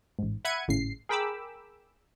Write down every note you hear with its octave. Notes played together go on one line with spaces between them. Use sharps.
A1 G#2
E5 F#5 B5 G#6 C#7 D#7
G#1 A2 C#3 C7
G#4 A#4 G5 B5 D6 E6